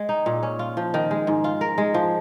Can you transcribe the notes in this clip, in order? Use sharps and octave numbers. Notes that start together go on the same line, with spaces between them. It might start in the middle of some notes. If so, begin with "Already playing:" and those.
Already playing: G#3
D#4
A#2
C#4
F4
F3
D#3
G#3
G#2
F4
A#4
G#3
F3